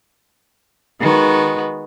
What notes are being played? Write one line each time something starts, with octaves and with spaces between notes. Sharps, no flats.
D#3 G#3 B3 F#4